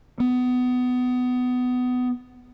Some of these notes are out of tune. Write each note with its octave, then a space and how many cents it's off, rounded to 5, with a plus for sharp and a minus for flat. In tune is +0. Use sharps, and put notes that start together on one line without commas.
B3 +20